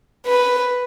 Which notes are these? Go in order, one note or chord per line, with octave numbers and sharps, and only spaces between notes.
B4